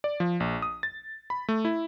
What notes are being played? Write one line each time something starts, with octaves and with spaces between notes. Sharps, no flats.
D5
F3
A#1
D#6
A6
B5
A3
E4